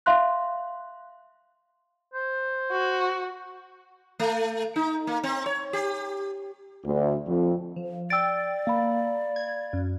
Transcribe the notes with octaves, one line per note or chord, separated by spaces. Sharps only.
E5 F5 C6 F#6
C5
F#4
A3
D#4
A#3
C4
C#5
G4
D2
F2
F3
D5 G5 E6 A6 D7
A#3 F5 B5
G#6
F#2